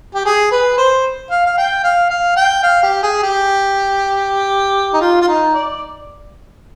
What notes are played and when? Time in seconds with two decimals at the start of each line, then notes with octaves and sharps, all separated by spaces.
0.15 G4
0.26 G#4
0.52 B4
0.78 C5
1.31 F5
1.46 F5
1.58 G5
1.84 F5
2.10 F5
2.37 G5
2.63 F5
2.83 G4
3.03 G#4
3.23 G4
4.94 D#4
5.01 F4
5.21 F4
5.28 D#4
5.54 D5